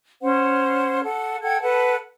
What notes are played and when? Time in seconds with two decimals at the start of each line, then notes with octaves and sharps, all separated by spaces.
0.22 C#4 C5 F#5
1.04 A4 F#5
1.43 A4 F#5 G5 G#6
1.62 A4 B4 F#5 A5